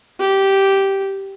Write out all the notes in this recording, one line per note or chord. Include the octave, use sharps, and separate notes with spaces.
G4